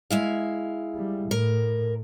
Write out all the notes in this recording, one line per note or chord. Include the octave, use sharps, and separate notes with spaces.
G#3 E4 F5
G3
A2 A#4